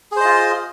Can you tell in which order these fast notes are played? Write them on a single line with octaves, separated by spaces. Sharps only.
G#4 C5 D#5 F4